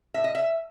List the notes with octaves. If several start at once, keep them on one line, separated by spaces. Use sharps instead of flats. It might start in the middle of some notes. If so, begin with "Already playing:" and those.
A2 E5
D#5
E5